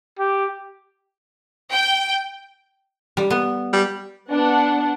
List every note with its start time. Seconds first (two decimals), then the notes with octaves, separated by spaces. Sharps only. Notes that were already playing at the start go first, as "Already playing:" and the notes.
0.19 G4
1.72 G5
3.17 G3
3.30 B3
3.73 G3
4.30 B3 D4 F#5